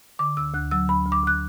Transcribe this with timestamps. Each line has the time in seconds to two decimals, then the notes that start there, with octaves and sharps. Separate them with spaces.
0.19 D3 D6
0.37 D2 E6
0.54 D2 F#6
0.71 F#3 E6
0.89 D2 B5
1.06 D2
1.12 D6
1.24 D2 F#6